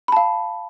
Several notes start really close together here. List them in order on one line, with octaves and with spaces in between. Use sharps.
B5 A5 F5